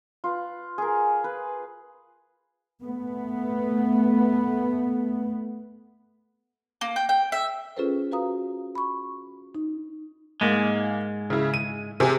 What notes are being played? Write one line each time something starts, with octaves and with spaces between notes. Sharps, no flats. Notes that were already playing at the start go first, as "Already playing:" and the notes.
F4 B4
G#4 A#4
B4
A3 B3
A#3
G5
G5
E5
C#4 F4 G#4 A4 B4 C5
F#4 B4 F5 A#5 D#6
B5 C#6
D#4
G#2 G#3 A#3
C#3 E4
D#7
C3 G#4 G#5